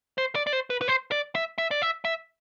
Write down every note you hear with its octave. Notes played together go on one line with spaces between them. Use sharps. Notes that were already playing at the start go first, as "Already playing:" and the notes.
C5
D5
D5
C5
B4
B4
C5
D5
E5
E5
D5
E5
E5